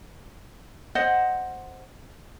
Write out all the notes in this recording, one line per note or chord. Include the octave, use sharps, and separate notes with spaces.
C5 D#5 F#5